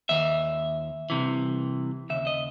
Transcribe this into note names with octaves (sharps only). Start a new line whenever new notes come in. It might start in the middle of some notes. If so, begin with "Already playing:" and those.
D#2 D#3 E5
C2 C3 E3
D#2 C#3 E5
D#5